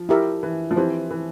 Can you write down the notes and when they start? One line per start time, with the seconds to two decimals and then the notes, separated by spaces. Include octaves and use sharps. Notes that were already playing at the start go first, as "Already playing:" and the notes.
Already playing: F3
0.09 E4 G4 A#4 E5
0.43 E3
0.71 F3
0.76 E3 C4 G4 C5
1.11 E3